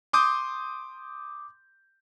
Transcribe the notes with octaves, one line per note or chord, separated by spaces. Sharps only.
C6 D6 D#6 G6